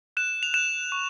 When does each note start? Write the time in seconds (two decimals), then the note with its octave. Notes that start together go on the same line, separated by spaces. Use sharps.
0.17 F#6 E7
0.43 F7
0.54 F#6 E7
0.92 C#6